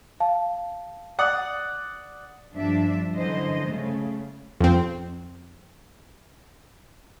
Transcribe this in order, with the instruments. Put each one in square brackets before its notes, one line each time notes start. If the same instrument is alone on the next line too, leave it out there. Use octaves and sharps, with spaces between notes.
[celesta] F5 A5
[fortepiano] D5 F#5 D#6
[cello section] G2 F3 D4 E5
F#2 D3 E3 C5 D#5
C#3 A3
[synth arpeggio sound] F2 C4